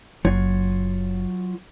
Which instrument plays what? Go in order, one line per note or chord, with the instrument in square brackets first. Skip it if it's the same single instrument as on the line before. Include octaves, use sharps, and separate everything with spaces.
[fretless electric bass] F#1 [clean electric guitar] F#3 F4 C#5